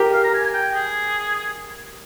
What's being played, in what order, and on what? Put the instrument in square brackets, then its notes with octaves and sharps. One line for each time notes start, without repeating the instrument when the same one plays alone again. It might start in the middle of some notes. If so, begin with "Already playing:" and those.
Already playing: [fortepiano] G4 A#4
[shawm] F5
A#5
G#5
G#5
G5
G#4